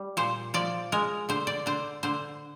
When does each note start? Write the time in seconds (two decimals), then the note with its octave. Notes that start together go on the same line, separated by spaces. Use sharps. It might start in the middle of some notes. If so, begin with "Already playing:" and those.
Already playing: G3
0.17 A#2 C5
0.54 F3 D5
0.92 G#3 A#4
1.29 D3 C5
1.47 D5
1.66 D3 C5
2.03 D3 C5